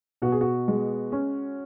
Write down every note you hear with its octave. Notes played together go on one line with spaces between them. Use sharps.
B2 F#4
G#4
F#4
G#3
C#4